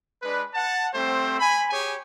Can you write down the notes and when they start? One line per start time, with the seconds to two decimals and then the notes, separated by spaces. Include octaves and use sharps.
0.22 G#3 D4 B4
0.54 F#5 A5
0.94 G3 A3 C4 C5
1.40 G#5 B5
1.70 G4 G#4 C#5 G#5